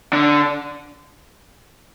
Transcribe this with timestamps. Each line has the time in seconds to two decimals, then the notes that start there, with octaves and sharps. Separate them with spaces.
0.13 D3